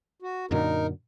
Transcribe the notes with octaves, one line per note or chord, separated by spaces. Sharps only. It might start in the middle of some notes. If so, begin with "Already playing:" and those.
F#4
F#2 A#2 D3 D#4 A#4